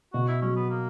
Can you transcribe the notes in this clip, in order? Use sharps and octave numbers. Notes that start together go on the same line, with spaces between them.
B2 F#4
E4
F#3 C#4
B3
A#3